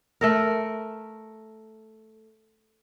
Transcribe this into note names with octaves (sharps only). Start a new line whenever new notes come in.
A3 A4 A#4